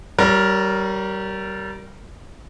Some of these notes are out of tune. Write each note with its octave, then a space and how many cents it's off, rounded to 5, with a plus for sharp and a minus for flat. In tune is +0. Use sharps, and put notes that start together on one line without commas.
G3 -25 A#4 +0 C#5 +0